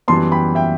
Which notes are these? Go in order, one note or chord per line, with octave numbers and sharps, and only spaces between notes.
F#2 E3 G3 B3 A5 C6
G5 B5
E5 G5